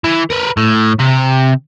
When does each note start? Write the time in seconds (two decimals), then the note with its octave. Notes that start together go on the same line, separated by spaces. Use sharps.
0.04 E3
0.30 A#4 B4
0.57 A2
0.99 C3